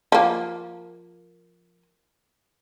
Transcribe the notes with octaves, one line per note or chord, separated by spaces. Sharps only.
F3 A#3